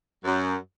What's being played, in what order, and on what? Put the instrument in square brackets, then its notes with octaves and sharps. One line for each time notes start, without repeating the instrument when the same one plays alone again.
[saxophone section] F#2